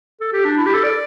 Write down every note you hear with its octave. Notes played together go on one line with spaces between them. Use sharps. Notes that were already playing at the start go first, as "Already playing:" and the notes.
A4
G4
D4
E4
G4
A4
D5